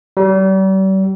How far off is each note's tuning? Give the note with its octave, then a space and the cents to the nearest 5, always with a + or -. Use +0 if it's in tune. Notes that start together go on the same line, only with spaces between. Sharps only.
G3 -40